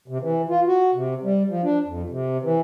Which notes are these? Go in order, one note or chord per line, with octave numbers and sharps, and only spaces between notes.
C3
E3
F4
F#4
C3
G3
F3
D4
F2
C3
E3